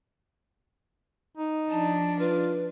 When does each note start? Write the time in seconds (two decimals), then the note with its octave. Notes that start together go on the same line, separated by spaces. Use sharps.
1.38 D#4
1.70 F3 D4 A5
2.19 F4 B4